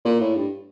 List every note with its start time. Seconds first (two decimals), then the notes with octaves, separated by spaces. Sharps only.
0.05 A#2
0.20 A2
0.35 G2